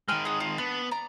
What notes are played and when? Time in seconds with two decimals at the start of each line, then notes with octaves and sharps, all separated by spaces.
0.08 D#3 G#3 G5 G#5 F6
0.25 G#4 F#5
0.40 F4
0.58 B3 D4
0.91 D5 A#5